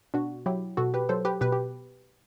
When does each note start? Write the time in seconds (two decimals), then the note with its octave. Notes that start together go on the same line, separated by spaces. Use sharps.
0.14 B2 D4 F#4
0.46 F#3 E4 G4
0.77 B2 F#4 A4
0.94 G4 B4
1.09 F#3 A4 C5
1.25 G4 B4
1.41 B2 G4 B4
1.52 G4